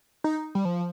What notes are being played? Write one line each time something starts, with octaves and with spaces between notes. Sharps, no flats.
D#4
G3
F3